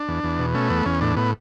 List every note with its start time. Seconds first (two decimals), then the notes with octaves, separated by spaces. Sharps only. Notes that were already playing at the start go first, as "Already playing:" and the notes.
Already playing: D4
0.08 E2
0.24 E2
0.39 B2
0.54 A3 C#4
0.70 E2 B3
0.86 E2 C#4
1.01 A2 D4
1.17 A2 B3